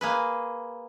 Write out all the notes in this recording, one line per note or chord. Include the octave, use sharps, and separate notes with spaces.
A#3 G#4 B4